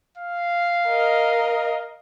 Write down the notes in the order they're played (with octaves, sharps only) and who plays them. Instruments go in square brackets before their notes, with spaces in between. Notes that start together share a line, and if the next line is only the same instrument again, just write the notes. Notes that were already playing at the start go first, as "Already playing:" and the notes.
[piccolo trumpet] F5
[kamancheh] A#4 D#5